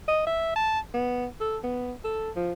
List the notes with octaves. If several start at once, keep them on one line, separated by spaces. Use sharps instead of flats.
D#5
E5
A5
B3
A4
B3
A4
F3